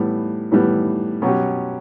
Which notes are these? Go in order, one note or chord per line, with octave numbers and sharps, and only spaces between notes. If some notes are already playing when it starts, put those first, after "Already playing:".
Already playing: A2 E3 G3 B3
A2 E3 G3 B3
B2 F#3 C#4 G4